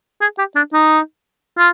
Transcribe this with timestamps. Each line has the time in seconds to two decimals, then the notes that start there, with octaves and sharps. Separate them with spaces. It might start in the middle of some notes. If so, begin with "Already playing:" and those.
0.21 G#4
0.38 G4
0.56 D4
0.73 D#4
1.58 F4